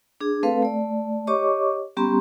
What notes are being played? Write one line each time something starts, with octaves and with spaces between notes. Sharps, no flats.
D4 G#4
A3 C4 A4 B4 F5
A3 D5
G4 C#5 D#5 C#6 D6
G3 B3 C#4 G4 A#5 C6